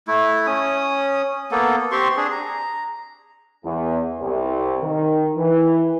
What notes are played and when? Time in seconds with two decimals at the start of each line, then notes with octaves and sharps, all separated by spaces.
0.08 A3 E4
0.47 C#4 D#6
1.51 A#3 B3 A4
1.92 C4 G4 C6 C#6
2.17 D4 G#4
2.32 A#5
3.64 E2
4.20 C2
4.82 D#3
5.36 E3